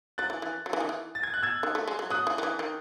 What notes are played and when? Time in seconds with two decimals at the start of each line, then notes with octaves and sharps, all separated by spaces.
0.18 F#3 F#6 A6
0.30 E3
0.42 E3
0.66 F#3
0.73 E3
0.80 D#3
0.89 E3
1.15 A6
1.23 G#6
1.34 F#6
1.43 E6 G#6
1.63 D#3
1.75 A3
1.87 G#3
1.99 F#3
2.10 F#3 D#6 F#6
2.27 E3
2.38 D#3
2.43 E3
2.59 D#3